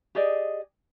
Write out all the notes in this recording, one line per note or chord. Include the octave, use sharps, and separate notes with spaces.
G4 G#4 D5 D#5